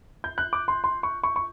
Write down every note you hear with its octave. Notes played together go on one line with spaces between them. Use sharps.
G6
F#6
D6
C6
C6
C#6
C#6
C#6